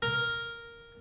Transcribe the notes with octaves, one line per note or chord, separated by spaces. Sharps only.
A#4